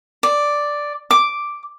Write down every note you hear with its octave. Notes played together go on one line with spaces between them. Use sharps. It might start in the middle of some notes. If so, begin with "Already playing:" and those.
D5
D6